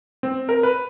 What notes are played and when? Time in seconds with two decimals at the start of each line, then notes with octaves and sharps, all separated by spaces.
0.23 C4
0.49 A#4
0.63 B4